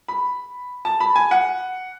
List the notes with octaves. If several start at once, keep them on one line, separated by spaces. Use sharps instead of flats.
B5
A5
B5
G#5
F#5